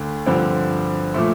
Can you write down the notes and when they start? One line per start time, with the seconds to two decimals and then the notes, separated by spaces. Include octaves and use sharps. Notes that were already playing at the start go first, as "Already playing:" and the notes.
Already playing: D2 D3 A3
0.27 G2 D3 F3 C4
1.14 A#2 F3 A3